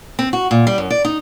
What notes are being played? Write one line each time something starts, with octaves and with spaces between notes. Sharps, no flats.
C4
F#4
A#2
G3
F#2
D5
D#4